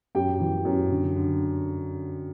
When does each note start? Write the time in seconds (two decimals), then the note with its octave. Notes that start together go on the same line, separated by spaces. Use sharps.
0.15 F#2 G4 G5
0.40 E3
0.65 F#2
0.91 D3
1.16 D3